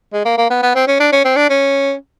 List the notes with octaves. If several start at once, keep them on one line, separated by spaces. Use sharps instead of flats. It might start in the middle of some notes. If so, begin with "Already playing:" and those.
G#3
A#3
A#3
B3
B3
C4
C#4
D4
C#4
C4
D4
C#4